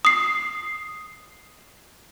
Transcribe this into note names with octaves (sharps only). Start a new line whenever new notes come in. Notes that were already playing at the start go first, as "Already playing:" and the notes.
D#6 C7